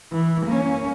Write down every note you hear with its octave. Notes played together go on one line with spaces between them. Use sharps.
E3
A#3 C#4